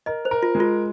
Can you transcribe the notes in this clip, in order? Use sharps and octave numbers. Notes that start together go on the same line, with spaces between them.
A#4 D#5
C5
A#4
F4
G#3
F4